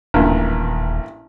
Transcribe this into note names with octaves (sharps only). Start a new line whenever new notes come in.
D#1 A1 G2 A#2